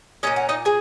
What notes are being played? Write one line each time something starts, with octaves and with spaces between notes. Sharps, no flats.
A#2 G#3 C#4 D#5
F#5
D#4 D#5
G#4 G#5